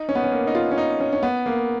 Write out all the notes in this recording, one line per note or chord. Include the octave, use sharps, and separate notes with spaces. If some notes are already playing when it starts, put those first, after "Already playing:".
Already playing: D#4
C#4
B3
C#4
A#3
D#4
F4
C#4
D#4
C#4
C#4
B3
A#3